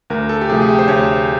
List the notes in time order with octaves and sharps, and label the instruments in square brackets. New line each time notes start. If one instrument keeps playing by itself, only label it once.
[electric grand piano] D2 A#4
A4
G4
C3 F3 A3 G#4
G#4
G4
C5
D2 C#5